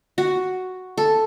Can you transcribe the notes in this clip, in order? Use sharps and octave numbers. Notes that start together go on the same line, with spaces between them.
F#4
A4